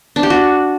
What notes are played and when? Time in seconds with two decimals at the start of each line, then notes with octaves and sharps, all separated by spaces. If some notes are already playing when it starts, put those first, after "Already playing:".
0.16 D4
0.23 G4
0.30 F#4